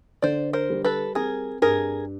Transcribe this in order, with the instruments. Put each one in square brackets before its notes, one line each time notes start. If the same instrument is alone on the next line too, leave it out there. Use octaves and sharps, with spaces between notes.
[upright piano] D3 [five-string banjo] C5 D5
[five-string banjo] A#4 C5
[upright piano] G3
[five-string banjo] A4 B4
[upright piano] C4 [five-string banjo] G#4 A#4
[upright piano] G2 [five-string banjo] G#4 A#4